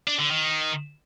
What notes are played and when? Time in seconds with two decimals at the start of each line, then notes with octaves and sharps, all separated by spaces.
0.07 D4
0.19 D3
0.31 D#3